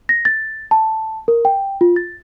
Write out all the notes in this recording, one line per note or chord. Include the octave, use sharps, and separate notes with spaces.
A#6
A6
A5
A#4
G5
F4
A6